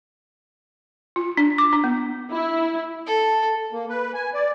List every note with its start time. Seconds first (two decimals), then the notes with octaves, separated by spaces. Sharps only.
1.16 F4
1.37 D4
1.58 D6
1.73 D4
1.84 B3
2.29 E4
3.07 A4
3.72 A#3
3.89 B4
4.14 G#5
4.34 D5